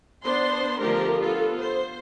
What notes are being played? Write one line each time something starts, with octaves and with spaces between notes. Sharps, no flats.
B3 D4 C5 C6
D3 F3 A3 G4 A#4
B3 F4 A4
C5